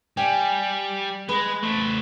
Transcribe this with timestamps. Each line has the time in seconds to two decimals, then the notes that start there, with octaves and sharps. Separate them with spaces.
0.17 G3 G4 D5 G#5
1.29 G#3 B4
1.62 A3 C5